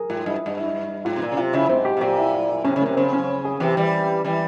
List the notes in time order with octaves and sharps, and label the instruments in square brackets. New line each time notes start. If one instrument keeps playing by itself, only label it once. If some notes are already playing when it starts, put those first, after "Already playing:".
Already playing: [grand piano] G#4 A#4
[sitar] G#2 [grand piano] F4
[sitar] G2 [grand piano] E4
[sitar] G2
[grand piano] E4
[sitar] G#2 [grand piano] F4
[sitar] C3
A#2
C#3
[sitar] C3 [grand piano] F4
[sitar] C#3 [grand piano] E4
[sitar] G#2 [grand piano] C4
[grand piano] G4
[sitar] C3
[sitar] A#2 [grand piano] G4
[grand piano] E4
E4
E4
[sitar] C3 [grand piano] C#4
[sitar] C#3
[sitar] C3 [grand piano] A#3
[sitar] C#3 [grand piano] C4
[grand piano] C#4
G#4
[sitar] C3 E3 [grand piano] G4
[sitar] E3 G3
[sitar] E3 G3 [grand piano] E4